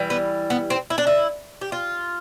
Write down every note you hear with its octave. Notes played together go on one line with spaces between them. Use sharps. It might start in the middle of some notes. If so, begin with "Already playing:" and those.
Already playing: E3 G3
B3
B3
C4
E4
D4
E4
G4
F4